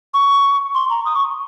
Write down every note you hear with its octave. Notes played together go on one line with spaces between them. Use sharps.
C#6
C6
A#5
D#6
C#6